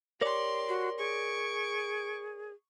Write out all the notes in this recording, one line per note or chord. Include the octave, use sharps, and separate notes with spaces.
G4 A#4 C#5 D5 C6
F#4
G#4 C#6 D7